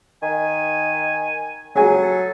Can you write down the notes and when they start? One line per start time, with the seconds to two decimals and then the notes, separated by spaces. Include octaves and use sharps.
0.22 D#3 G#5
1.75 F#3 G#4 G#5
2.02 A4